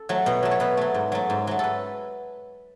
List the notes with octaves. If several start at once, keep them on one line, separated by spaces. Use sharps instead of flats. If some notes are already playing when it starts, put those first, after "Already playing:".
Already playing: A4
F#3 A3
B2
F#3 A3
C#5
B2 B4
F#3 A3
G#2
F#3 A3
G#2
F#3 A3
A4 B4